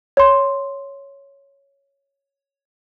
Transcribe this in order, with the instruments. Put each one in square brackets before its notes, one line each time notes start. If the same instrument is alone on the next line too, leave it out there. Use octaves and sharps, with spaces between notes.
[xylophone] C#5 C6